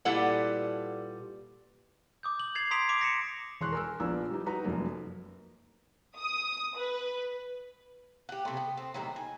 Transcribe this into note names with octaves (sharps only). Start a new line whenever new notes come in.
A#2 G3 E4 A4 B4 F#5
D6 D#6 G6
F#7
G#6 A6 C7 F7
A#5 C6 D#6 B6 D7 F7
D6 C7 D7 F7
A#6 C#7 E7
E1 C6 C#6 F#6
A#4 G#5 E6
A#1 B3 D4 A#5 E6
G3 D#4
D#4 F#4 B4 A#5
F1 F#2 A#3
D#6
B4
G4 F#5
C3 A3
B3
C4
A2 C3 D#3 F#3
G#5